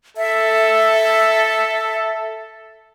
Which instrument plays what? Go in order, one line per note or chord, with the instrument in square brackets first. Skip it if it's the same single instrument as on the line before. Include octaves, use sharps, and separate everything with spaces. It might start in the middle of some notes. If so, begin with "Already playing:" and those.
[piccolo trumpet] A4 [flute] E5